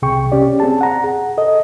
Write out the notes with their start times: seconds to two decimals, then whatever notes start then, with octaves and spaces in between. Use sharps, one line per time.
0.02 C2 C3 G#4 G5 C#6
0.32 C#4 G4 D5
0.60 C4 G#4 A5
0.81 F#5 A#5
1.04 G#4
1.38 A4 D#5